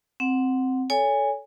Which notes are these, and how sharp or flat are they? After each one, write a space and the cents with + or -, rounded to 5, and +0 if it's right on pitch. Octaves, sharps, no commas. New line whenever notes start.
C4 +0 F#5 -5
A4 -5 C#5 +25 G#5 -15